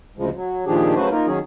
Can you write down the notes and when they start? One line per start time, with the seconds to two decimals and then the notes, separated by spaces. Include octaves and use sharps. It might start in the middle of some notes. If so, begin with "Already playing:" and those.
0.18 D2 C#3 F3 G#3
0.35 F#3
0.67 A#2 D#3 F3 D4 G4 G#4
0.96 C#3 F#3 A3 F#4 B4 C5
1.11 A#3 D#4 F4 A#4
1.26 D#3 F#3 C#4 G#4